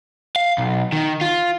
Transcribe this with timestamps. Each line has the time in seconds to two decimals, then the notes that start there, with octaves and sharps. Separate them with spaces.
0.36 F5
0.58 B1
0.92 D#3
1.21 F4